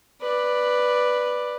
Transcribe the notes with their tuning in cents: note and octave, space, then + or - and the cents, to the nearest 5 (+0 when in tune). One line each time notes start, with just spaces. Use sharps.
B4 +0 D5 +10